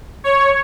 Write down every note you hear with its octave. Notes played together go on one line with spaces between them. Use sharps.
C#5